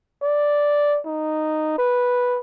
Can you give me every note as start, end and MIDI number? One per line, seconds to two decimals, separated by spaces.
0.22 0.99 74
1.06 1.75 63
1.78 2.40 71